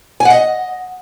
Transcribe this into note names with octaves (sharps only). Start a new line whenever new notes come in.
G#5
F#5
D#5